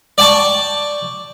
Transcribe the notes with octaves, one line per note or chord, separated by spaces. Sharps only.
D5 G5 A5 C#6